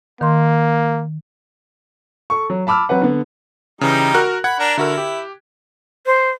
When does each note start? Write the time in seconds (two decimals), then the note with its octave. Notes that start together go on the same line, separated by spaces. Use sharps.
0.21 D#3 A#3 C6
2.30 A4 C#6
2.50 F#3
2.67 A5 B5 D6 E6 F6
2.89 F#3 C4 B4 F#5
3.02 D3 B3
3.81 C#3 E3 G3 D#4
4.14 F#4 A#4 F#6
4.44 F#5 B5 G#6
4.60 D4 A#4
4.77 D3 E4 F#4 A#4
4.98 G4
6.06 C5